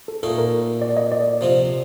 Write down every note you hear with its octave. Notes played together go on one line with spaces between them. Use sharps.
A4
A#2 A3 D#4 A4
A#4
D5
D#5
D5
C3 F3 C4